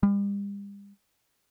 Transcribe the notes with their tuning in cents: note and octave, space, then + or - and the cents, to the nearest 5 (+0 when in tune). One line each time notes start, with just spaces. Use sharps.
G3 +40